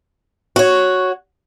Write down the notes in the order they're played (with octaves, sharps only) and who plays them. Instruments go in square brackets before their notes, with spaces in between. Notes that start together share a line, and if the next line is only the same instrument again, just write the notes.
[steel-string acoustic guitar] F#4 C#5